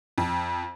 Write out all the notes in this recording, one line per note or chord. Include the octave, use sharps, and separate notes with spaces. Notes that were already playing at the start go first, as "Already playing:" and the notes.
F2